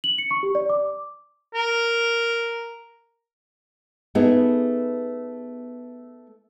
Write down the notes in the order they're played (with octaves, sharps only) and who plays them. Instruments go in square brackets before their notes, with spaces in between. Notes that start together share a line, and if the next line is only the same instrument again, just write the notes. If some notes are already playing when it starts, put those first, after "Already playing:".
[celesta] F#7
C#7
C#6
G4
D5
D6
[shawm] A#4
[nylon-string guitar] A3 B3 D#4 G#4